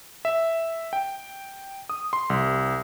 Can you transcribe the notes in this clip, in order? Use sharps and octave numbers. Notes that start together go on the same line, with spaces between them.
E5
G5
D#6
C6
C2